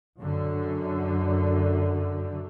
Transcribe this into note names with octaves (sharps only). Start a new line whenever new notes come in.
F#2 D3